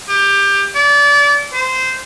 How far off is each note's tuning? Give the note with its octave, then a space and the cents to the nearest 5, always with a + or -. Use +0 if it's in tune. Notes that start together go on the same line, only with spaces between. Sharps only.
G4 +20
D5 -30
C5 -15